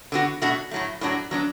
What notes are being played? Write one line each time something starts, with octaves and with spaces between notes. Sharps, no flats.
D3 B3 F#4
B2 A3 D4 F#4
A2 F#3 A3
A2 F#3 D4 F#4
F#3 B3 D4